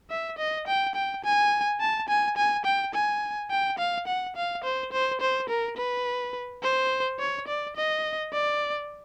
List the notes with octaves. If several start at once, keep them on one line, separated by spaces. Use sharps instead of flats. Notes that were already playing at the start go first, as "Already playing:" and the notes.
E5
D#5
G5
G5
G#5
A5
G#5
G#5
G5
G#5
G5
F5
F#5
F5
C5
C5
C5
A#4
B4
C5
C#5
D5
D#5
D5